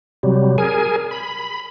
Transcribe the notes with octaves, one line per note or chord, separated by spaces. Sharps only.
C3 F#3 G3
G#4 A#4 G#5
B5